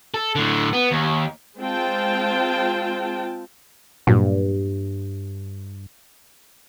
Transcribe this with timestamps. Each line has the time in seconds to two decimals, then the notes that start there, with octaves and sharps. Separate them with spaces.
0.14 A4
0.35 A2 D3
0.73 B3
0.92 D#2
1.59 G#3 C4 F4 G5 A5
4.07 G2 A#2 F#3